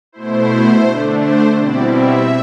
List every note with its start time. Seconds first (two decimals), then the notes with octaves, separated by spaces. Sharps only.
0.12 B2 A3 E4 C5
0.84 D3 A3 D4
1.21 C5
1.56 B2 G3 C4 E4 D5
1.92 E5